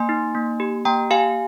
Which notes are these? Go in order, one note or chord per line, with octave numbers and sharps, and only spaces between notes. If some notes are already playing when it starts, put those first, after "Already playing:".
Already playing: A#3 G#5 C6
D#4
A#3
G4
A#3 G5 A#5
G4 F5 G#5